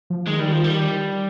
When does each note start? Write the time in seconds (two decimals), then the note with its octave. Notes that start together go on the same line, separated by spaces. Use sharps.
0.10 F3
0.26 D#3 G#3
0.39 G3
0.51 F3
0.64 G3